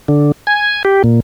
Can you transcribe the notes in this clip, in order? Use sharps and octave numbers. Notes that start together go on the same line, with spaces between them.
D3
G#5
G4
A#2